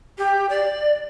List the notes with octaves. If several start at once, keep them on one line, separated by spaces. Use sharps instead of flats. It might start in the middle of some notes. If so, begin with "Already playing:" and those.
G4
D5